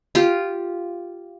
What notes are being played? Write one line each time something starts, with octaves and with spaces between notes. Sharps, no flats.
F4 G4